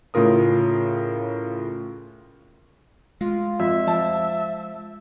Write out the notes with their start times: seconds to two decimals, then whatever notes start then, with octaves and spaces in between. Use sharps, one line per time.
0.14 A2 C#3 F4 A#4 D#6
3.21 G#3 F4
3.60 F2 E5
3.87 F3 A5